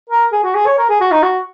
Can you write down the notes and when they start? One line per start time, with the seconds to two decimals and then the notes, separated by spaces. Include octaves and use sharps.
0.10 A#4
0.33 G#4
0.44 F#4
0.55 G#4
0.66 C#5
0.78 A#4
0.89 G#4
1.01 F#4
1.12 D#4
1.23 F#4